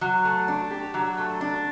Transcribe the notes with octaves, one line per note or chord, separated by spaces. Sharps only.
F#3
A3
D4
G4
F#3
A3
D4